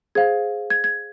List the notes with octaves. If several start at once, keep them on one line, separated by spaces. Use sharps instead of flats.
G#4 C5 F5 G#6
G#6
G#6